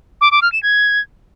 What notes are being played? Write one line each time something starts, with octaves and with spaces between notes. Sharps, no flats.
D6
D6
F6
E7
G#6